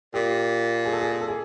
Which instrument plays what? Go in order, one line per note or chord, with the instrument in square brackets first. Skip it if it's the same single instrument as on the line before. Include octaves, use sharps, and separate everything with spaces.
[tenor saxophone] A#2 [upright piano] G4
[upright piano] G#4
A4
G#4
A4
G#4